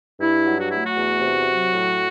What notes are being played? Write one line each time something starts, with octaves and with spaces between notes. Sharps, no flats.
G2 E4
F#3
F#4
A3 E4
F#4
E2
C3
F#3
A2